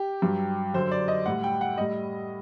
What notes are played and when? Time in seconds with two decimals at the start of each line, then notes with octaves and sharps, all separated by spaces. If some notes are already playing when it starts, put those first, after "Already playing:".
Already playing: G4
0.22 G2 F#3
0.74 F#2 D3 F#3 C5
0.91 D5
1.08 D#5
1.26 A2 G3 F#5
1.44 G5
1.61 F#5
1.78 A2 G3 D#5